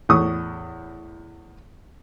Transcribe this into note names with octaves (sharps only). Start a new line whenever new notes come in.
E2 A2 C#6 D#6